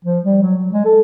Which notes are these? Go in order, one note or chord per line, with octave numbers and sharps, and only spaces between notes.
F3
G3
F#3
F#3
G#3
A4